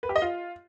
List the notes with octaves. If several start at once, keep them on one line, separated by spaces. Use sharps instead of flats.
B4
G4
D#5
F4